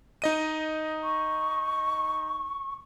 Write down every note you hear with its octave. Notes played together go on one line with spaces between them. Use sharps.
D#4 D#5 D#7
C#6